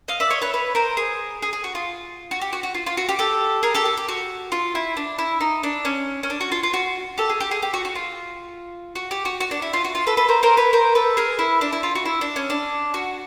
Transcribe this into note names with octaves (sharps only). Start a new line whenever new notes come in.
D#5 F5
D5 E5
C#5 D#5
B4 C#5
B4 C#5
A#4 C5
G#4
G#4
G#4
F#4
F4
F#4
G4
F#4
F#4
F4
F4
F#4
G4
G4 A4
G#4 A#4
G4 A4
G4
G4
F#4
F4
E4
D4
E4
D#4
D4
C#4
C#4
D4
F#4
F4
F4
F#4
G4 A4
G#4
G4
G#4
G4
F#4
F#4
F4
F#4
G4
F#4
F#4
D4
E4
F4
F#4
F4
A4 B4
A4 B4
A#4 C5
A#4 C5
B4 C#5
A#4 C5
A4 B4
G#4 A#4
E4
D4
E4
F4
F#4
E4
D4
C#4
D4
F#4